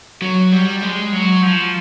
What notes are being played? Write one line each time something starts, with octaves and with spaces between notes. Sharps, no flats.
F#3
G3
G#3
F#3
F3